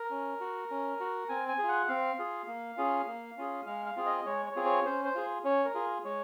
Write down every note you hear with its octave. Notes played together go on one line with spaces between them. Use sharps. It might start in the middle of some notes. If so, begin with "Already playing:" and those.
Already playing: A#4
C#4
F#4
C#4
F#4
C4 G#5
G#5
F4 G#4
F#5
C4 F5
F4 G#4
A#3
C#4 F4 G#4
A#3
C#4 F4 G#4
G#3 F5
F5
C4 F4 G#4
D#5
G#3 C#5
C#5
C4 F4 G#4
C#5
C#4 C5
C5
F4 G#4
C#4 C#5
A#4
F4 G#4
G#3 C#5